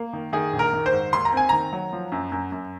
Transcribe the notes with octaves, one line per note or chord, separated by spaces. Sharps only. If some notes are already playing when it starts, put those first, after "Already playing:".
Already playing: A#3
D#3
D#3 G#4
A#1
A#4
D#3
C5
G#2
D#2 C6
A#5
C4 G#5
D#3 A#5
F#3
F3
F#2
F#2
F#2